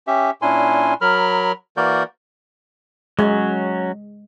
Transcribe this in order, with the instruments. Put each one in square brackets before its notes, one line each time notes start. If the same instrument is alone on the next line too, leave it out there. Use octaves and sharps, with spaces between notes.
[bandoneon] C#4 G4 E5
A#2 C#4 D4 E4 G#5 C6
F#3 A#4 B5 F6
E3 A#3 F#4 A#4 D5 G6
[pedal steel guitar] F#3 C#4 [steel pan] G#3